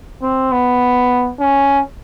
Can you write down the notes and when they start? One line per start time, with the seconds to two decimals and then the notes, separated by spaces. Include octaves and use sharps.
0.22 C4
0.52 B3
1.40 C#4